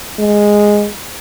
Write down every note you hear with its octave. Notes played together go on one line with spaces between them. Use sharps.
G#3